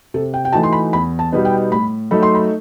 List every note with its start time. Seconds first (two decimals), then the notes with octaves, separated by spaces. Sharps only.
0.14 C3 A4
0.34 G5
0.45 G5
0.53 E3 A3 D#4 F#4 A5
0.63 C6
0.73 B5
0.93 E2 B5
1.19 A5
1.32 B2 G3 B3 D#4
1.45 G5
1.71 A2 B5
2.11 F#3 A3 D#4 A4 B5
2.23 C6
2.35 B5